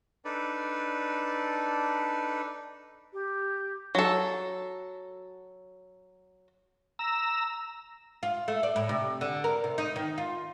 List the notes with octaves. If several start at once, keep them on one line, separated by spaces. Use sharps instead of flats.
D4 D#4 A4 B4 D5
G4
F#3 A4
A#5 E6
F4
A3
D5
A2
C3
D3
A#4
C3
D#4
D#3
F4